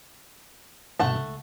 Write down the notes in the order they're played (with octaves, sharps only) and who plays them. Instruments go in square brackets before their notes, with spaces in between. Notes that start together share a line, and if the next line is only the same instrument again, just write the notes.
[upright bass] G1 B2 [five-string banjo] A3 F#5 A5
[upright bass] C#2